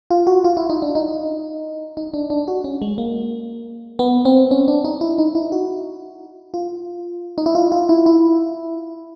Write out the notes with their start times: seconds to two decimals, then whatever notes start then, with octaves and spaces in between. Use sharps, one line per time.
0.11 F4
0.27 F#4
0.44 F4
0.57 E4
0.70 D#4
0.82 D4
0.95 D#4
1.97 D#4
2.14 D4
2.30 D4
2.48 F#4
2.64 C#4
2.82 G#3
2.98 A#3
3.99 B3
4.25 C4
4.51 C#4
4.68 D4
4.85 D#4
5.01 E4
5.18 D#4
5.35 E4
5.52 F#4
6.54 F4
7.38 D#4
7.46 E4
7.55 F4
7.72 F4
7.89 E4
8.06 E4